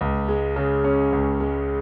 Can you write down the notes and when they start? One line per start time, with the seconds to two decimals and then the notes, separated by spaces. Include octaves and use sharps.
0.01 C#2
0.28 G#3
0.56 C#3
0.84 C#4
1.12 C#2
1.40 G#3